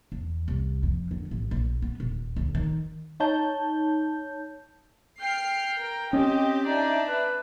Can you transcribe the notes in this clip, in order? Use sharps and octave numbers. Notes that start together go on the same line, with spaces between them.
E2
C2
F2
D3
A1
A#1
B3
D#1
D2
D#3
D#4 C#5 A5 G6
G5 F6 C7
A#4
C4 C#4 G4 D#5
D4 D#4 D5 E5
B4